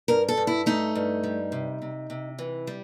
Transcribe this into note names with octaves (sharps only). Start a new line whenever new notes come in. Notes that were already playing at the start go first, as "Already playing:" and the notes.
G2 A#4
A4
G2
E4
A3 D#4
G2
G3
C3
C3
C3
E3
G3